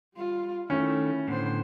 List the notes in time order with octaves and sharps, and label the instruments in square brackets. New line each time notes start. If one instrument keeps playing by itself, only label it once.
[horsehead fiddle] G3 F4
[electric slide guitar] D#3 A3 [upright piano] C#4 [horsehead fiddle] E4
[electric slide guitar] A2 D3 [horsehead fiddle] B3 C5